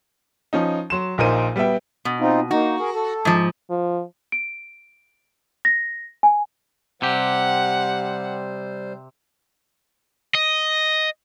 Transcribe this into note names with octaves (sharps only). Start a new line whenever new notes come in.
F3 C#4 D#4
F#3 C6 E7
A#1 A#2 D#4 A#4 C5 D#7
G3 B3 B4 E5 G5
B2
C4 D#4 F4
A#3 D#4 F#4
G#4 A#4
A4
G#2 F3
F3
D7
A#6
G#5
C3 G3 G4 C5 F#5
D#5